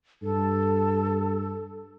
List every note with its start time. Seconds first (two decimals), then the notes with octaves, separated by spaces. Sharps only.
0.23 G2 A4